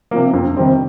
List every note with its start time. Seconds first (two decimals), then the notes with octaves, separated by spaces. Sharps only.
0.11 C3 F3 A#3
0.33 F2
0.57 C3 D#3 G3 C4